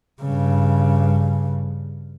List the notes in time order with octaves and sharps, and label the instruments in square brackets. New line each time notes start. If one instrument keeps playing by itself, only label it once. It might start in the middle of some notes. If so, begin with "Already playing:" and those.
[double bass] G2 C#3